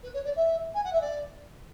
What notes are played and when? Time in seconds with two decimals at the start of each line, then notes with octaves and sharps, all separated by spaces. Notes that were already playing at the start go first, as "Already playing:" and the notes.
0.03 B4
0.13 C#5
0.25 D5
0.35 E5
0.74 G#5
0.83 F#5
0.92 E5
1.01 D5